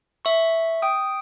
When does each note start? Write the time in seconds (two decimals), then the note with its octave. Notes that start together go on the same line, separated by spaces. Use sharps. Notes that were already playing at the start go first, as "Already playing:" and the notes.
0.25 E5 C#6
0.82 G5 D#6